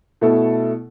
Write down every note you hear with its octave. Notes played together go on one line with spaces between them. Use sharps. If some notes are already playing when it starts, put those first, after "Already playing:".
B2 A3 E4 A4